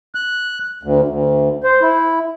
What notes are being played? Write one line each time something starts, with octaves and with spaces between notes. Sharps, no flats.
F#6
D2
D2
C5
E4